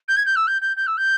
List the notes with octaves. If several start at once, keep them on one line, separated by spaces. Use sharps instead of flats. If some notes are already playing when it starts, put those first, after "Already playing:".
G6
G#6
G6
E6
G6
G6
G6
E6
G6